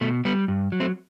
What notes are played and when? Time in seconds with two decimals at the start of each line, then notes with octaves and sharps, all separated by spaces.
0.01 B2 A3
0.25 G3 B3
0.48 G2
0.72 F#3
0.80 A3 C4